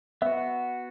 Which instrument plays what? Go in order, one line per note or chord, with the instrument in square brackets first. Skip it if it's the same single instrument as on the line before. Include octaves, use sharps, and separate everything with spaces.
[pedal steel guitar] B3 F#4 [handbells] E5